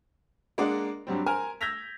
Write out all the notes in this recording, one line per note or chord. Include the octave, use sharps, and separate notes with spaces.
G#3 A#3 D4 D5 D#5 F#5
G2 F#3 G3 C4
A#4 C5 G#5 A#5 F6
E6 G6 G#6 A#6 B6 F7